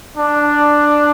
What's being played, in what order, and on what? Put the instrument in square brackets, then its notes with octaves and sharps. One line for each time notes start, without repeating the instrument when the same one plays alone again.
[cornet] D4